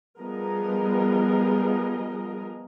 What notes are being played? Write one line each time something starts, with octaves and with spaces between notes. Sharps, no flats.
F3 G3 B3 G#4 A#4 D#5